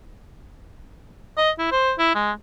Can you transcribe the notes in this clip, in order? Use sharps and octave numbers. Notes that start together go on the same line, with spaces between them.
D#5
E4
C5
E4
G#3